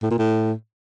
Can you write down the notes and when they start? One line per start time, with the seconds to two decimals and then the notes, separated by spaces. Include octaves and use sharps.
0.03 A2
0.11 A#2
0.19 A2